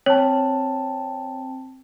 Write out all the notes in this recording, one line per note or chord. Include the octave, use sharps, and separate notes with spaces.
C4 C#5 A5